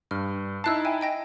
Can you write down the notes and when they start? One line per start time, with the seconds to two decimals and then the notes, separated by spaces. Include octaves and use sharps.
0.11 G2 F6
0.64 D#4 E4 A5 E6 F#6 C7
0.85 E5 G5 G#5
1.01 D#5 G5 A#6